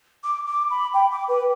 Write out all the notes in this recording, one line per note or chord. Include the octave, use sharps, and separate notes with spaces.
D6
D6
B5
G5
D6
B4